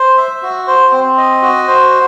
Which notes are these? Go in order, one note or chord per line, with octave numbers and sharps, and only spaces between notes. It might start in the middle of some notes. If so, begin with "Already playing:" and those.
Already playing: C5
E5
F#4
C5
C4
D#5
F#4
C5